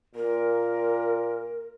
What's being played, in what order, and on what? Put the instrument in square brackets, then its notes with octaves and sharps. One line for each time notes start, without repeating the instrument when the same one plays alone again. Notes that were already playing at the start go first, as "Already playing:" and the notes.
[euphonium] A#2 [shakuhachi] A#4